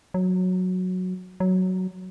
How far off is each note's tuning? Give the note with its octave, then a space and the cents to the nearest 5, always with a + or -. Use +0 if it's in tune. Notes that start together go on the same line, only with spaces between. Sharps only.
F#3 -10
F#3 +5